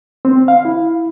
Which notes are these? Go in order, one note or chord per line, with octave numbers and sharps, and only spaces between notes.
C4
F5
E4